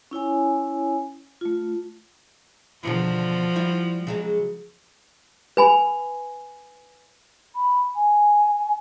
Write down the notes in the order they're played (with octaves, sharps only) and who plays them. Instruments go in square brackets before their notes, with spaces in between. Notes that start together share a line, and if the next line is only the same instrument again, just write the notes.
[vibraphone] C#4 E4 C#5 G#5
A3 F4
[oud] E2 B2 D3 [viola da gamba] F3 F#4
[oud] G3 E4
C#3 F#3 G#3
[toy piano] B4 G#5 B5
[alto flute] B5
G#5